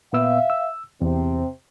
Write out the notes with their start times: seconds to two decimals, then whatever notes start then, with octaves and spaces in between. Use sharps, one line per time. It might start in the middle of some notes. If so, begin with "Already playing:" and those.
0.13 A#2 B3 E5 F5 E6
0.50 E6
1.02 E2 C3 C4